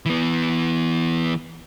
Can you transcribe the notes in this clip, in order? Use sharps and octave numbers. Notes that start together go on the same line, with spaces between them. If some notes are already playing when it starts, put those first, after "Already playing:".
E3 B3